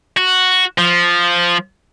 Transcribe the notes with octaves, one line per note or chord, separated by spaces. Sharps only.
F#4
F3